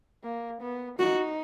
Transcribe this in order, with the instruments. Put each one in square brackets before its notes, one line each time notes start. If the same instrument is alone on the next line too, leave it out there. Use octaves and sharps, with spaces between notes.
[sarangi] A#3
B3
[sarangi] D#4 [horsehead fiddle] F#4